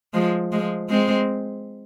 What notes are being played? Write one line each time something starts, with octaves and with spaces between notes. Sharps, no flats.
F3 G#3
F3 G#3
G#3 C4